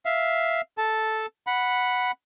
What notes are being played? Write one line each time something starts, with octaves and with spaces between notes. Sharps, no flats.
E5 F5
A4 A5
F#5 B5